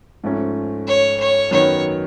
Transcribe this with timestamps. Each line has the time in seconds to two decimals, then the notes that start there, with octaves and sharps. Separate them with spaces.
0.24 G#2 F3 A3 C#4
0.87 C#5
1.20 C#5
1.51 F#2 D#3 F#3 B3 C#5